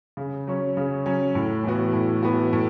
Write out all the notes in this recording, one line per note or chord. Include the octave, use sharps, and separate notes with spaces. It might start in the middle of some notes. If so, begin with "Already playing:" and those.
C#3
F#3 C#4
C#3
F#3 C#4
A2
E3 B3 F#4
A2
E3 B3 F#4
A2